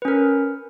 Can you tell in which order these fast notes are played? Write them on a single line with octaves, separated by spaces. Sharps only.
B4 C#4 A#4